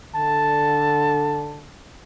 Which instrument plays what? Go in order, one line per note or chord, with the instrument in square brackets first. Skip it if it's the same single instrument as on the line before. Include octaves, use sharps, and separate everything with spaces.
[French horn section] D3 [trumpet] A5